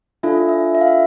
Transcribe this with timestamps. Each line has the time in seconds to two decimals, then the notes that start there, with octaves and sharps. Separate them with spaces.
0.23 D4 F4 A4 E5
0.49 E5
0.75 E5
0.81 F5
0.88 E5